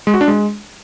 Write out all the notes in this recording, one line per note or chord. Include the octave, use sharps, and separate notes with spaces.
G#3
F#4
D4
G#3